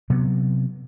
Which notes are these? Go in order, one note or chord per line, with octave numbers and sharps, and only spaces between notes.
C3 F#3 B3